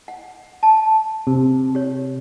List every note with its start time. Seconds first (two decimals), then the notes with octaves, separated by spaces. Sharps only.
0.08 F#5
0.63 A5
1.27 C3
1.75 G4 C#5